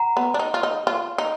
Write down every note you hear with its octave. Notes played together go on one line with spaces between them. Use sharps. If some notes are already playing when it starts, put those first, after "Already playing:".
Already playing: F#5 A#5
B3
D4
D#4
F4
D#4
F4
D#4